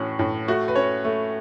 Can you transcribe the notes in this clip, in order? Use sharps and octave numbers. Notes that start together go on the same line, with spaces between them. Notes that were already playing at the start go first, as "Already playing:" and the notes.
Already playing: A2 E3 C#4 F#4
A2
A3 F#4
B4
C#4 C#5
A3